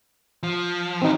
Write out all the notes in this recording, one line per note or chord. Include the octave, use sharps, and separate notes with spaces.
F3
D#3 F#3 C4 D#4